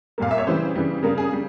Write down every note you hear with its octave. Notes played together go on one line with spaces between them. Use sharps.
A#2 G3 A#3 F5
E5
C#5
C#3 E3 G3 C5
C#3 E3 G3
C#3 G3 A#3 A#4
G#4
C#3 G3